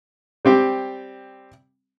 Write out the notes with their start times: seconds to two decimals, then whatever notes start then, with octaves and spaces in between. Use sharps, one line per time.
0.45 G3 C4 G4